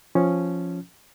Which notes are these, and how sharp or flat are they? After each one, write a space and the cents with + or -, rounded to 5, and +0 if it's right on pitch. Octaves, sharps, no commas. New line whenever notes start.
F3 +0 C#4 +0